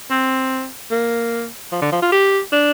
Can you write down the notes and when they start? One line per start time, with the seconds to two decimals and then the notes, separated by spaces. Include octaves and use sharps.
0.10 C4
0.91 A#3
1.72 F3
1.81 D3
1.92 F3
2.02 F4
2.12 G4
2.52 D4